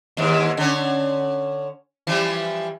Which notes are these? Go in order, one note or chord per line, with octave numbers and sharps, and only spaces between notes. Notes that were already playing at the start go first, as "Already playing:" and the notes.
D#2 G#2 E3
D3 C#4
E3 F3 G3